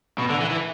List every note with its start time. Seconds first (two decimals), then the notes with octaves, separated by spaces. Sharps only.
0.18 B2
0.30 D3
0.40 E3
0.51 E3